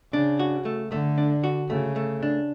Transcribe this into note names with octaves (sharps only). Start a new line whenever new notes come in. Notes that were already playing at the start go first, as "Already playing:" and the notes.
C#3 D4
F#4
A3
D3 A3
D4
F#4
C#3 A3
A3
D4